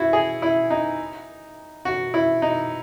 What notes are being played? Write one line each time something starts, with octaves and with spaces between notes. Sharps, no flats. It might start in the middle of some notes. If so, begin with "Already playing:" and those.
Already playing: E4 F#4
G#4
E4
D#4
F#4
E4
D#4